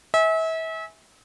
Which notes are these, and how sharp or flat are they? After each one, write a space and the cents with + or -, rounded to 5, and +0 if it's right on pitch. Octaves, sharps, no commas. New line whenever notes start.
E5 -35 G#5 +0